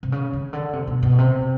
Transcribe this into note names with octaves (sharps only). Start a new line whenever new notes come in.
C3
C#3
C#3
D3
C3
B2
B2
C3